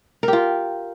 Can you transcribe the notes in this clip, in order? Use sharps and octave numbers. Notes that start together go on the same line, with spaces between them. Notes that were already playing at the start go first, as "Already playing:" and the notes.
F4 G4 A#4